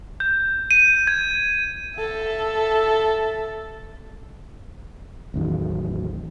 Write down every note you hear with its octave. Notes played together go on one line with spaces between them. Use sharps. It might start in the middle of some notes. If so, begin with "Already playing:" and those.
G6
D#7
G#6
A4 E5
A1 E2 D#3 F#3